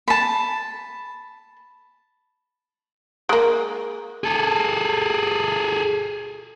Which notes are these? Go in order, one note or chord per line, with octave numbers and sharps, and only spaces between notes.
A5 B5
G#3 A#3
G#4 A4